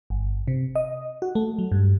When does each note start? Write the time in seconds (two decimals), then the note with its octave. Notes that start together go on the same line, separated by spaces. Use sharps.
0.10 G1
0.48 C3
0.75 D#5
1.22 F#4
1.35 A3
1.59 F#3
1.72 G2